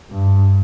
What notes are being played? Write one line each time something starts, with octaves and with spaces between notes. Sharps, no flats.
G2